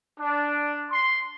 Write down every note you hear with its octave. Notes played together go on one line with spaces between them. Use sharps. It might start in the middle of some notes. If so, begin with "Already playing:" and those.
D4
C6